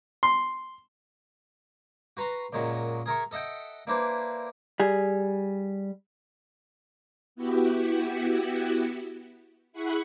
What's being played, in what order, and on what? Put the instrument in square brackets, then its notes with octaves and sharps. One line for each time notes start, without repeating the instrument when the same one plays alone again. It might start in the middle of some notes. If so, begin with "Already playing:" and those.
[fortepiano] C6
[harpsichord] F#4 B4 A#5 C6
F#2 A#2 G#3 F#4
G#4 A#4 E5 C#6
A4 D#5 E5 F#5 G5
A#3 D4 E4 B4 C5
[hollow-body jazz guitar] G3 G#4
[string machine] B3 E4 F#4 G4
E4 G#4 F#5 B5 C#6